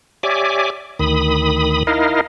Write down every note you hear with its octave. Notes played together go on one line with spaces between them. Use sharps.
G4 C#5 D5 E5 G#5 D6
D2 D#3 B5 D#6
D#4 E4 A#4 D#5 F5